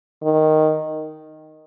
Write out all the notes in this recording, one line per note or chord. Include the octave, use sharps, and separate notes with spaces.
D#3